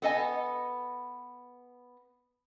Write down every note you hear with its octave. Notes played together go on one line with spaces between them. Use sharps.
B3 A4 D#5 G#5